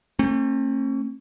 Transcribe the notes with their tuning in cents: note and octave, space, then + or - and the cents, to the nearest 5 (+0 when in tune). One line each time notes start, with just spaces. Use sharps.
A3 +40 C#4 -45